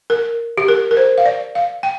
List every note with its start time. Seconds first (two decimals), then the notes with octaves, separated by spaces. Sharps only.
0.10 A#4
0.58 G4
0.68 A#4
0.91 A#4
0.97 C5
1.18 F5
1.26 D5
1.55 F5
1.83 G5